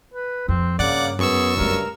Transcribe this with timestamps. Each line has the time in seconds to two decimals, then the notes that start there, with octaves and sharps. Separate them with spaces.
0.14 B4
0.48 F2 C4
0.79 G2 C#3 A#3 D5 F#5 D6
1.19 F#2 B3 G#4 C#6 E6
1.57 G2 C#3 A3 A#4